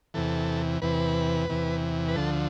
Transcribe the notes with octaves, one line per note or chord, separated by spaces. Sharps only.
E2 C3 E3 A4
E2 C3 E3 B4
E2 C3 E3
B4
D2 D3 F3 A4